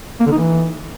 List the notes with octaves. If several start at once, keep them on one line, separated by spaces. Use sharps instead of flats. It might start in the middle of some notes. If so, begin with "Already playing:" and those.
A#3
D3
D#4
E3